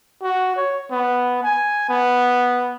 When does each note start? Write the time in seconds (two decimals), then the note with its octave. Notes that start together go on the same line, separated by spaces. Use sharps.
0.22 F#4
0.56 C#5
0.91 B3
1.43 G#5
1.89 B3